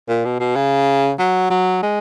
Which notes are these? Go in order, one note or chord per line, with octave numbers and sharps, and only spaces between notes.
A#2
B2
B2
C#3
F#3
F#3
G#3